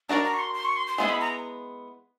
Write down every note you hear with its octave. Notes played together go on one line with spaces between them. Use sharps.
D4 F#4 A#4 D5 A#5
A#5
C#6
C6
C6
C#6
C6
C6
G#3 B3 E4 G#4 C6
B5
A#5